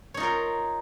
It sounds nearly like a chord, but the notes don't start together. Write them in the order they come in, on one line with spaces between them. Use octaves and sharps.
C#5 D#4 F4 A#4